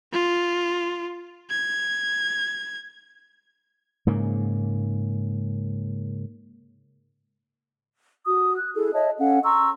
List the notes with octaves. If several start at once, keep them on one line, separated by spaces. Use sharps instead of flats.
F4
G#6
G#2 C#3 A#3
F#4 D#6
F#6
E4 G#4 A4
C#5 D#5 E5 A5
C#4 A4 F5 F#5
A#5 C6 C#6 E6